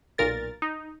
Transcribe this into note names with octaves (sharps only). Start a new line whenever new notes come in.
B1 A#2 A#4 A6
D#4